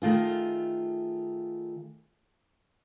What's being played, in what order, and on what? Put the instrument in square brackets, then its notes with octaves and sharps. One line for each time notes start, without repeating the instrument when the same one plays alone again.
[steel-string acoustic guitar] D#3 A3 F4 G#4